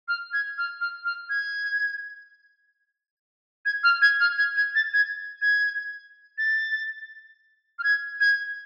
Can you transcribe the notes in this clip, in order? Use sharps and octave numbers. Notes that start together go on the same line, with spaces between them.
F6
G#6
F6
F6
F6
G#6
G#6
F6
G#6
F6
G#6
G#6
A6
G#6
G#6
A6
F6
G#6
G#6